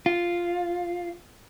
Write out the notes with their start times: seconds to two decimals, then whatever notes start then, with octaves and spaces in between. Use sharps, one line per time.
0.06 F4